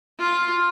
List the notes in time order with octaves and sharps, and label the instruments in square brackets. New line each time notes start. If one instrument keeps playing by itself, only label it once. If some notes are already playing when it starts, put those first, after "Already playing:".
[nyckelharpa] F4